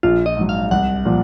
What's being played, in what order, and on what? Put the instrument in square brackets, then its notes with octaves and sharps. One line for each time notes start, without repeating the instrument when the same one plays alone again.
[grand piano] A#1 [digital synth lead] F4
[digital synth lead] D#5
[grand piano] G#2 F#3
[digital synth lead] F5
[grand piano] C2 [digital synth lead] F#5
[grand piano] A#2 F3